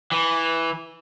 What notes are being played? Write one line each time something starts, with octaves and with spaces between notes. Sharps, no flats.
E3